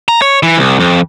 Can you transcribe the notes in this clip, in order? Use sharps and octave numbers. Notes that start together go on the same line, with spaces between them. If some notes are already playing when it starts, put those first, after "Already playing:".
A#5
C#5
E3
C2
F2